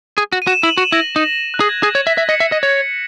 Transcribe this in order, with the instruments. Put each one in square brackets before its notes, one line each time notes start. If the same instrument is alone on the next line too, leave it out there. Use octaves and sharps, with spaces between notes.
[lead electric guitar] G#4
F#4
[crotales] D#7
[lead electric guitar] F#4 [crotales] E7
[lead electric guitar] E4 [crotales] F#7
[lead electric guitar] F#4 [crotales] E7
[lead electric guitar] E4 [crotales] A#6
[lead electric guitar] D#4
[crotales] F#6
[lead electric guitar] G#4
[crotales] G#6
[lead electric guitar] G#4 [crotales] A#6
[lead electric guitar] C#5
[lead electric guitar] E5 [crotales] B6
[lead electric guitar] E5
[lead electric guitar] D#5 [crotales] C#7
[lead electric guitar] E5
D#5
C#5